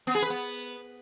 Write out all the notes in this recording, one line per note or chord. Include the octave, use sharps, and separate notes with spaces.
B3
G#4
B4
B3